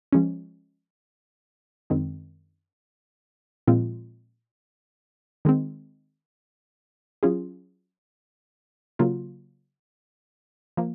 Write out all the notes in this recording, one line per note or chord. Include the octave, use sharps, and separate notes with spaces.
F3 G#3 C#4
F#2 D#3 G#3 C4
A#2 F3 G#3 C4 F4
D#3 G#3 C4
F#3 C#4 F4 G#4
C#3 F#3 A#3 F4
F3 A#3